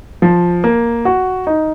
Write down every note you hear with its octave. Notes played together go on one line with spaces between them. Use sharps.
F3
A#3
F#4
D#4